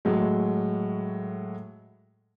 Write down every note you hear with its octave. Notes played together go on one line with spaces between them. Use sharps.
A2 F#3 G#3